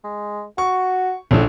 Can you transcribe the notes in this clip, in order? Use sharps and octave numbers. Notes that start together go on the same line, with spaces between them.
G#3
F#4 C#6
A#1 A2 D3